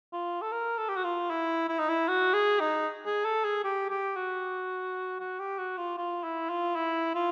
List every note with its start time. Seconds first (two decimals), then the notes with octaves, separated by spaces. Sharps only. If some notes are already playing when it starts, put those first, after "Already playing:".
0.13 F4
0.42 A4
0.52 A#4
0.77 A4
0.89 G4
0.96 F#4
1.04 F4
1.30 E4
1.69 E4
1.79 D#4
1.89 E4
2.08 F#4
2.34 G#4
2.60 D#4
3.06 G#4
3.25 A4
3.44 G#4
3.64 G4
3.90 G4
4.16 F#4
5.20 F#4
5.39 G4
5.58 F#4
5.78 F4
5.97 F4
6.23 E4
6.49 F4
6.76 E4
7.15 F4